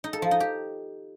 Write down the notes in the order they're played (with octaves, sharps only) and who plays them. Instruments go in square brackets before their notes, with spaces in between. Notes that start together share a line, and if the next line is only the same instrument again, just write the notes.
[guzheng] D#4
A4
F3
D#4
G4